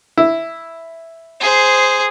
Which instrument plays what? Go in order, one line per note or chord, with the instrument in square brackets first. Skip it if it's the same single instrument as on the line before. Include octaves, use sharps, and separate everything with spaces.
[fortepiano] E4
[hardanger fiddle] G#4 C5